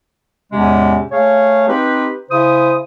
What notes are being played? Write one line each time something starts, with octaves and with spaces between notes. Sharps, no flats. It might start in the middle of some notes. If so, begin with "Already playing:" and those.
E2 A2 C3 G#3 C#4
A3 G#4 C#5 F5
C4 D#4 G4 B4
C#3 E4 C5 D#6